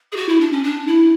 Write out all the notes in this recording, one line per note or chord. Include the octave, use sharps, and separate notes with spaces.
G#4
F#4
E4
D4
C#4
D4
E4